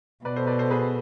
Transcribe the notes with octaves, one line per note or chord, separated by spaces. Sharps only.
B2 B4 D5
A4 C5
B4 D5
A4 C5
G#4 B4